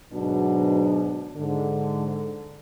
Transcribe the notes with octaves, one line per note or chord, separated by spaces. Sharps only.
D2 G#2 B2 F#3 D4
G#2 D3